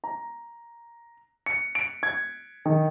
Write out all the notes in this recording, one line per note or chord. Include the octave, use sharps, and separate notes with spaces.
A#5
C#7
D7
G#6
D#3